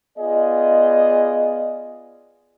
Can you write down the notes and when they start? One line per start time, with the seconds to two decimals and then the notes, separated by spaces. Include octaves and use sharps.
0.19 B3 F4 G#4 D5 D#5